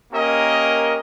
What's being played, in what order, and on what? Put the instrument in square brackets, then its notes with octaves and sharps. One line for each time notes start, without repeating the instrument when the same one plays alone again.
[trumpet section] A#3 C#4 G4 A#4 D#5